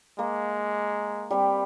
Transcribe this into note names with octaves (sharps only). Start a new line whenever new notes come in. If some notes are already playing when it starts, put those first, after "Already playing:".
G#3 A#3
G3 C4